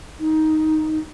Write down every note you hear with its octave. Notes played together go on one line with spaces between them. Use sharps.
D#4